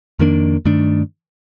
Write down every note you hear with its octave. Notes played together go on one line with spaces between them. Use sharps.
F2 D#3 A#3 D4
G2 D#3 A3 D4